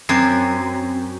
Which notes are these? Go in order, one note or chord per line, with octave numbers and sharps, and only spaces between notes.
F#2 C4 G#6 C7